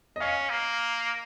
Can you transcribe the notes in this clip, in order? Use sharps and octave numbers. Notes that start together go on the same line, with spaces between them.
D#5
C#4 F5
A#3